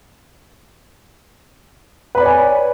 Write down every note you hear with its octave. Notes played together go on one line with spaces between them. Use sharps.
B4 C#5 D5 G#5 B5